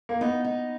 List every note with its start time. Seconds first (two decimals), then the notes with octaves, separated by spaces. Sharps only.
0.09 A#3
0.21 B3 D#4
0.45 D#4